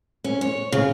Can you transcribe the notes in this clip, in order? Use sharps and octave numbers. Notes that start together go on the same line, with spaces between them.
C#4
C#5
C#3